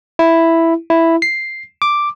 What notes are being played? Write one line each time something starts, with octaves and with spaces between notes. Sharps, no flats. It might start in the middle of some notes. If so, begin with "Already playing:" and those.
E4
E4
C7
D6